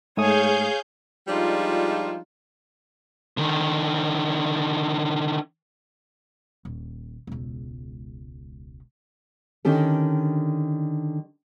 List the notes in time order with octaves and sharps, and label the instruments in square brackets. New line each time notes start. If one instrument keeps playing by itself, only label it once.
[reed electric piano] G#2 A3 D#6 [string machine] G#4 F5 G6 [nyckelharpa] C#5 G#5
[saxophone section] F3 G3 G#3 D4 D#4 F4
[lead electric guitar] D3 D#3
[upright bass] D#1
E1 C#2
[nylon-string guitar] D3 D#3 C#4 G4 A4